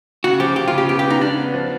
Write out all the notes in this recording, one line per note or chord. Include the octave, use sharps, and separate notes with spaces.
C#3 F#4
F3 G4
C#3 G4
F4
C#3 G4
B3 G4
G4
B3
D#4
B3 D4
B3
F3